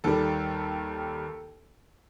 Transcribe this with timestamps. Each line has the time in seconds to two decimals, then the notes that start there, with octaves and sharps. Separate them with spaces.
0.04 D#2 D#3 G3 A4